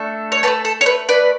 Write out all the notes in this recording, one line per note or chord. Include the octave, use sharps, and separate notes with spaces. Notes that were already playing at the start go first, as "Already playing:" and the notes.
Already playing: A3 D4 A4
C#5
A3 D4 A4 B4
A4
C#5
B4
B4 D5